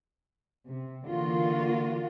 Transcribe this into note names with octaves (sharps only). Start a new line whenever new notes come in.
C3
D3 E3 A#3 F4 F#4